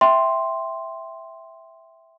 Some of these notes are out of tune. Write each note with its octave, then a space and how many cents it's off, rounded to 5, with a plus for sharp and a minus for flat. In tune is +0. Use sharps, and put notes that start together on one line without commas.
E5 +0 G5 +0 C6 +0